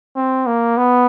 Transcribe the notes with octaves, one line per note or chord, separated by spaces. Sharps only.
C4
A#3
B3